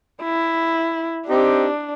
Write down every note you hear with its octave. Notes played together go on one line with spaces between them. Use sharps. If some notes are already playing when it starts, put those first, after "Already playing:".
E4
C4 D4 D#4 G4